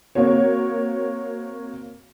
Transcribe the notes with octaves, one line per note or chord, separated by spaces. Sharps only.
A#3 C4 F#4 C#5